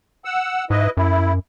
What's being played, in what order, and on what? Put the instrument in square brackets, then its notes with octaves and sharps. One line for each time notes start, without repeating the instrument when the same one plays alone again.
[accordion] F#5 E6
[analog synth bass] G#2 [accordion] E4 B4 D#5
[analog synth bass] F#2 [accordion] E4